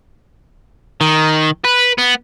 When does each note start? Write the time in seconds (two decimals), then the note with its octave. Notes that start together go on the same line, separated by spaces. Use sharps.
1.01 D#3
1.65 B4
1.98 B3